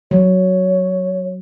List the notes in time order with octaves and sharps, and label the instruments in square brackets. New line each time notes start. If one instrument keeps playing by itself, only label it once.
[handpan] F#3 [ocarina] C#5